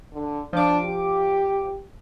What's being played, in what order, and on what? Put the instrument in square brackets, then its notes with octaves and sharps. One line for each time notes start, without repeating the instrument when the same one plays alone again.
[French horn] D3
[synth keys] F3 D6 [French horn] D4
[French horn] G4